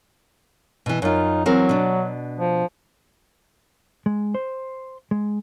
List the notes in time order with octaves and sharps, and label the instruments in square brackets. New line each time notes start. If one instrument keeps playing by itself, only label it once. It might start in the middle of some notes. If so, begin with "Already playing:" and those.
[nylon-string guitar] B2 E3
[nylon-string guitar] F#2 F4 [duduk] D#4
[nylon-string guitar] E3 C4 A#4 [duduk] F#3
[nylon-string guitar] B2 D4
[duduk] F3
[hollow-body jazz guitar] G#3
C5
G#3